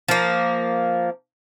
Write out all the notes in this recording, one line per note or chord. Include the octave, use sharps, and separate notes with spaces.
F3 A#3